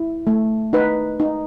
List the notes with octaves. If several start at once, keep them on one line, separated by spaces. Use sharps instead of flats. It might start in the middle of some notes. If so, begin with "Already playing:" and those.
Already playing: E4
A3
D#4 B4
D#4